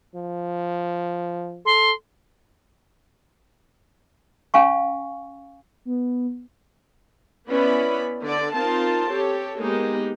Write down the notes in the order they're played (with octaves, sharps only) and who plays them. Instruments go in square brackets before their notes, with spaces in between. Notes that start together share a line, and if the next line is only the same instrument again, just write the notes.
[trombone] F3
[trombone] A4 [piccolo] C6
[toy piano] C#4 F5 G#5 C#6
[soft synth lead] B3
[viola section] B3 C#4 E4 B4 D5 B5
D3 D5
C4 D#4 F4 A#4 A5 C6
G4 A4 C#5
G#3 A#3 B3 D#4 G4